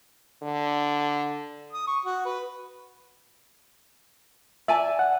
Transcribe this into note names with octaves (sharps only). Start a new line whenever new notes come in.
D3
D#6
C#6
F#4
B4
D5 E5 G#5 A5
F#5